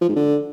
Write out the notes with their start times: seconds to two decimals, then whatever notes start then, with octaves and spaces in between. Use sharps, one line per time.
0.01 F3
0.09 G#2
0.16 D3